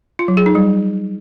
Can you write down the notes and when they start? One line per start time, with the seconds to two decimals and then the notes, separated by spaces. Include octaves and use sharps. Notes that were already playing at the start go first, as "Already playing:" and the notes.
0.19 F4
0.28 F#3
0.37 G#4
0.46 D#4
0.55 G3